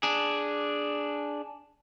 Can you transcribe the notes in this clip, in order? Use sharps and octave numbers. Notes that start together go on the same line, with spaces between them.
D4 G#4